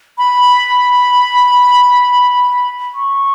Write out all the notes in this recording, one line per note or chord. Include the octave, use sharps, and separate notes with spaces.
B5
C#6